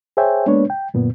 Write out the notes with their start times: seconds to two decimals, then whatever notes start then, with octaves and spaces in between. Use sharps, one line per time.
0.17 G#4 C5 C#5 E5 G5 G#5
0.46 G#3 A#3 B3 D4 B4 C#5
0.70 G5
0.94 F#2 A#2 D3 B3